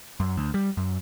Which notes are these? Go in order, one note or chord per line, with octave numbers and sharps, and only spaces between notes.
F#2
D2
G3
F#2